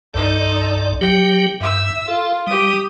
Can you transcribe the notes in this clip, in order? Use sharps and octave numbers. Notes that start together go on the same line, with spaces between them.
C2 G2 D#4 A4 D5
F#3 G4 G5
G2 E5 E6
F4 A4
G3 G4 D#6